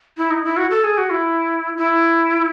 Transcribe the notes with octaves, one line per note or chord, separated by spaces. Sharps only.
E4
D#4
E4
F#4
A4
G#4
F#4
E4
E4